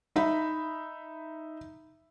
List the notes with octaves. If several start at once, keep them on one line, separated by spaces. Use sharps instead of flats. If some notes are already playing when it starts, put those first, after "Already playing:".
D#4 E5 B5